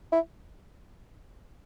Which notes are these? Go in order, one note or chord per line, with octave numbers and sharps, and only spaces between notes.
E4